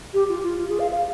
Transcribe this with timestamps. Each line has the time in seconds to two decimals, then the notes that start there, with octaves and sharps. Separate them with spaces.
0.14 G4
0.29 F4
0.43 F4
0.58 F4
0.69 G#4
0.79 F5
0.91 F5